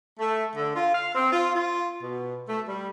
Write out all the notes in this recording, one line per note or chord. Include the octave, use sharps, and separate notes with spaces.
A3
D3
F4
F5
C4
F4
F4
B2
A3
G3